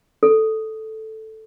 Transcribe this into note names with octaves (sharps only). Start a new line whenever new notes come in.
A4